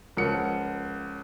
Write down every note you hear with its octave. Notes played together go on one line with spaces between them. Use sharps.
C#2 F3 A#4 F#5 C#7